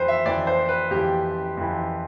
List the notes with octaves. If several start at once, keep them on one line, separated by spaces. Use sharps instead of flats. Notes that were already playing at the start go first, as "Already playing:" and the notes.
Already playing: F2 E3 B4 C5
E5
F2 E3 D5
C5
B4
F2 E3 G4
F2 E3